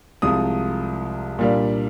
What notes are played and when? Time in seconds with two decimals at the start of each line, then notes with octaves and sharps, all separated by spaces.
0.22 C2 C3 F3 G#3 D#6
1.39 A#2 G3 A#3 D4